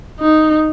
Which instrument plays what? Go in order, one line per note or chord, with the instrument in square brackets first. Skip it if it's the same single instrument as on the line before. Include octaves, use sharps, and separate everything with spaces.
[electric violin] D#4